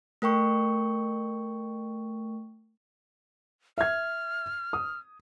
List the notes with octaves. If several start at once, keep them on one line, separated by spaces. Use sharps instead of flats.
A3 A#4 G5 C#6
E5 F6 G#6
D#6